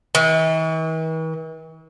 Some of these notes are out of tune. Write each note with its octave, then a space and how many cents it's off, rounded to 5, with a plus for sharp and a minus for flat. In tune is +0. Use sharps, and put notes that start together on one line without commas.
E3 -45